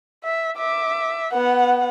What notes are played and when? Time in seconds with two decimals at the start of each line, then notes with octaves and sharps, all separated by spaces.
0.24 E5
0.58 E5 D6
1.33 B3 F#5